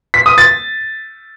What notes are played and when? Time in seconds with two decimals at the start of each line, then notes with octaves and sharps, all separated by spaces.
0.14 B6
0.26 D#6
0.38 A6